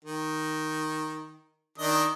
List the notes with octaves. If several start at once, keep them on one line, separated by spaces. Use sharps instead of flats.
D#3
D#3 D4 D#5